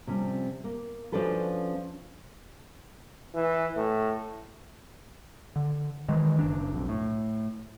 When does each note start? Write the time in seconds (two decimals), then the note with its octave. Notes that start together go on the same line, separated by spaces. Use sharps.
0.07 C3 F3 G3 C4 C#4
0.64 A#3
1.12 F3 C#4 D4 F#4 A4 B4
3.35 E3
3.77 A2
5.56 D3
6.09 D#3 E3 G#3
6.39 F#1 D4
6.73 B1 F2
6.89 A2